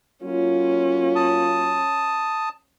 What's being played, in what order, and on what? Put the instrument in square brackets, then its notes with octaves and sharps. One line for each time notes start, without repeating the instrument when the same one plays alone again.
[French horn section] F#3 A#3 F4 [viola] C#4
[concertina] A5 D#6